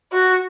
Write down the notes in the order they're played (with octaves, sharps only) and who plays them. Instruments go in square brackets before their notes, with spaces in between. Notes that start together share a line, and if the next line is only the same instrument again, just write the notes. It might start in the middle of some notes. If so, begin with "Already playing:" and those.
[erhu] F#4